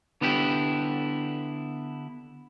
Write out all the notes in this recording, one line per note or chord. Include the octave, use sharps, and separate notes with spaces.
D3 B3 D4 E4 G4